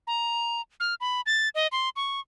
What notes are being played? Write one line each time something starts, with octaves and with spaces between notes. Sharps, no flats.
A#5
F6
B5
A6
D#5
C6
C#6